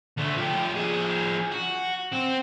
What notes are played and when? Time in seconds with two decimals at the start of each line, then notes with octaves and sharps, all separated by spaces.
0.17 D2 A3
0.37 F3 G4
0.75 F3 G#4
1.52 F#4
2.13 C4